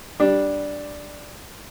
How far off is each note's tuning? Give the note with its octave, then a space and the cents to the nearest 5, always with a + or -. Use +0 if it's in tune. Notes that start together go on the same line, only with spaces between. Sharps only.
G3 -5 D4 +0